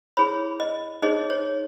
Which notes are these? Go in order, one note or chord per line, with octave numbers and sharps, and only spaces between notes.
E4 G#4 C#5 B5
D#5
D#4 G#4 C#5 D#5
C#5